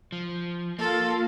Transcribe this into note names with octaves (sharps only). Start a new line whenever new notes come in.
F3
A#3 F4 A4